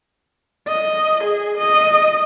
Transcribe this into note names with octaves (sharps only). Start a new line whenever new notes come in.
D#5
G#4
D#5